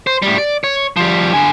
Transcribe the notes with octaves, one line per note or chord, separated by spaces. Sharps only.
C5
A2 G3
D5
C#5
F3 G3
D3 G#5